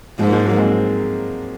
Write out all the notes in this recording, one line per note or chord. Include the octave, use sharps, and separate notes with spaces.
G#2 F3 G#3
A#3
F3 G#3
F#3 A#3
G#3 C4